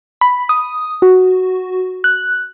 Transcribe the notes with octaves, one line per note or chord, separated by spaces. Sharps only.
B5
D#6
F#4
F#6